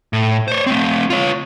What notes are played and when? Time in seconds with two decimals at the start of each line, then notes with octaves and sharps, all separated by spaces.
0.13 A2
0.48 C5 C#5
0.66 A3 C4
1.10 F4 C#5